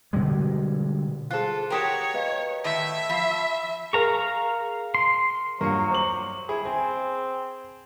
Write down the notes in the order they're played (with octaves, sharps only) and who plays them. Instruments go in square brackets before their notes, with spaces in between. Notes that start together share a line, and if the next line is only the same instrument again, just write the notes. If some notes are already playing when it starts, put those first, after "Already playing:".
[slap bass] B2 D3 G3 G#3
[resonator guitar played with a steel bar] F4 A4 [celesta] G#4 C5 F#6
[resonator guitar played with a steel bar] F#4 G4 A#4 [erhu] C#5 [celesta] G5 D#6 E7
[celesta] B4 D#5 F5
[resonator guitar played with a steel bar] A2 D#3 [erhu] E5
[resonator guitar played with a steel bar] F3 [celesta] B5 C7
[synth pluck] G#4 A#4 [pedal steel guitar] F5 A#5 C#6
[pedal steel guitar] C6
[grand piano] G2 F4 C#7 [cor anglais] F#3 [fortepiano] A#3
[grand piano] C5 D6 F#7
[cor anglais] E4 [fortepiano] G#4
[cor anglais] C4 [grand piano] G#5